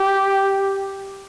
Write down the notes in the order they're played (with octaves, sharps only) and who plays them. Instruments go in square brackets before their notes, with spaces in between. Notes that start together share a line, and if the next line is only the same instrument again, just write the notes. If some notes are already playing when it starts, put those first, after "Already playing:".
Already playing: [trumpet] G4